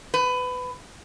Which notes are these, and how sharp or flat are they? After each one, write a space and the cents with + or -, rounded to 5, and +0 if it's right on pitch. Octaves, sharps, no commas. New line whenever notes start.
B4 +20